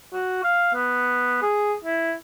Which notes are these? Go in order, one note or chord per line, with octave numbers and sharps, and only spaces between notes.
F#4
F5
B3
G#4
E4